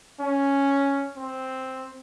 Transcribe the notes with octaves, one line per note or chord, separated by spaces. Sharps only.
C#4
C4